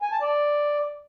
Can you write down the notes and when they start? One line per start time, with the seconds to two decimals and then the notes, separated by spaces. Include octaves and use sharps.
0.02 G#5
0.12 A5
0.22 D5